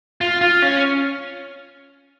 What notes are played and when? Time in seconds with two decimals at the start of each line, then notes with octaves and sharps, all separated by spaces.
0.21 F4
0.41 F4
0.62 C#4